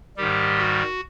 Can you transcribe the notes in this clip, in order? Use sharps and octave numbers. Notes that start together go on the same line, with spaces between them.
G#2 D#3 G3 G4
F#4